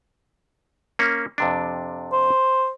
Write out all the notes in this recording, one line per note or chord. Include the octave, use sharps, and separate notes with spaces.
A#3 C#4
F2 C3 D4
C5